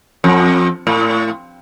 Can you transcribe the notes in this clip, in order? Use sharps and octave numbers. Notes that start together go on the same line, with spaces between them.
F2
A2